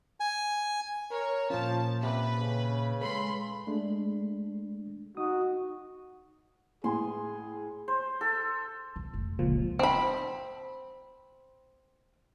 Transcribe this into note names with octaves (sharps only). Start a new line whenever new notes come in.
G#5
A#4 C#5
A#2 F3 C#4 A5
C3 B4
C#3
G#3 A4 B4 B5 C6
G#3 A3 D4
D#4 F#4 D#6
A2 G#4 G#5 C6
C5
A4
B2
F1
C#2 A#2 F3 C#4
C4 B5